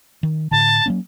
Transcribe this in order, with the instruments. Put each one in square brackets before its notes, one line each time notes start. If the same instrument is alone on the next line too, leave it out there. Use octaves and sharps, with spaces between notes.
[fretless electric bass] D#3
[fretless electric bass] A2 D3 [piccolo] A5
[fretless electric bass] F#3 A#3 C#4